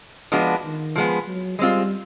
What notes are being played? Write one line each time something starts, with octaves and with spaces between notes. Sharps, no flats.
F3 G#3 B3 D4 F#4
D#3
F3 G#3 B3
F#3
G3 G#3 C4 F4